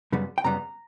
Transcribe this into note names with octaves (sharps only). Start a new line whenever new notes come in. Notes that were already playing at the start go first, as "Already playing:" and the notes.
F#2 C#3 G3 B3
G5
F#2 C#3 G3 B3 A#5